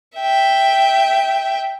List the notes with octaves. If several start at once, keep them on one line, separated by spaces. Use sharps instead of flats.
E5 G5